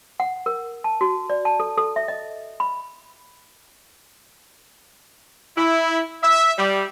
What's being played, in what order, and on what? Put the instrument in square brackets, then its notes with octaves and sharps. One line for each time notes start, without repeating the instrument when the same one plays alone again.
[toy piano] F#5
A#4
A5
F#4
D5
A5
A4
A4
E5
D#5
B5
[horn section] E4
E5
G3